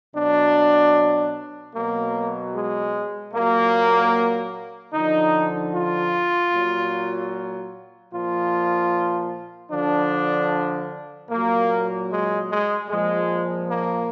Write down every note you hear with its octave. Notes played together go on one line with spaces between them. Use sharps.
B2 F#3 D4
B2 F#3 A#3
G#3
A#2 F#3 A#3
D3 F3 D#4
F4
A#2 F#3
A#2 F3 F4
D3 F3 D4
A#2 F#3 A#3
G#3
G#3
A#2 F3 G#3
A#3